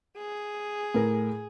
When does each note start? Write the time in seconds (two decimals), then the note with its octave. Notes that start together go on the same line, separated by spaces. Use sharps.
0.18 G#4
0.94 A2 A#4